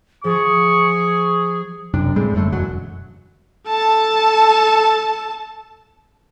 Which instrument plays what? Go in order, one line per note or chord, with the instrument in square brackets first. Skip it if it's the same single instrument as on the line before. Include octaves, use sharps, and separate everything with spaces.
[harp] F3 [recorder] G#4 [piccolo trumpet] C#6
[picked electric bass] F#1 F#2 C3 D4
A2 G3 G#3 C4
F#1 F#2 D3 A3
E1 F#2 F#3
[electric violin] A4 A5